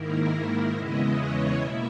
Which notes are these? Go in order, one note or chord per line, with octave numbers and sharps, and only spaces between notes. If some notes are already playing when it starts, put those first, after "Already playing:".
Already playing: G#2 D#3 A#3 E4 A#4
E2 C#3 G#3 B3 E4 D#5
C#5
B2 A#3 E4 E5